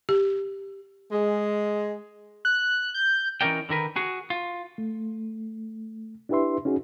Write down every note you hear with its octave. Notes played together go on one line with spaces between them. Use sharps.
G4
G#3
F#6
G6
E3 C#4 D#4 A#4 D5 G5
D3 D#3 A#4 B4
F#4 G#4
F4
A3
D4 E4 G4 B4 E5 C6
C#4 D#4 F#4 G#4